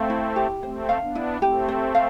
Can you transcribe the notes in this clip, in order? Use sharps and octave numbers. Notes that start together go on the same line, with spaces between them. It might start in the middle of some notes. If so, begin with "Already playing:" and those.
Already playing: A3 C4 F5
E4
G4
A3 C4 C5
F5
B3 D4
E4
A3 C4 G4
C5
F5